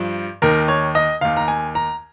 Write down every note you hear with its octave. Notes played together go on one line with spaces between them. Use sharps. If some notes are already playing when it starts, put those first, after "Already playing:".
Already playing: G2 F3
D#2 D#3 A#4
C#5
D#5
D#2 D#3 F5
A#5
G#5
A#5